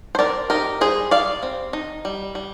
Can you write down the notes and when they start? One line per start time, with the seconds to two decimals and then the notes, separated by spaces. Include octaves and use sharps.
0.15 C5
0.19 C4 A#4 D5
0.50 D#4 G4 A#4
0.81 G3 G#4 C5
1.11 G3 D5 F5
1.43 C4
1.73 D#4
2.05 G3
2.35 G3